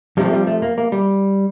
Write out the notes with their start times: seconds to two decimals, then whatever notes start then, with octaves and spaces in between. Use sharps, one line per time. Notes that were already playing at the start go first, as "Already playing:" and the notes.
0.17 F2 C3 F3 G3
0.26 A3
0.33 G3
0.47 A3
0.62 A#3
0.78 A#3
0.92 G3